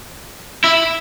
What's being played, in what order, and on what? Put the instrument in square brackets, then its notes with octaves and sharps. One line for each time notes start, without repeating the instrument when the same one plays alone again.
[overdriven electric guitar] E4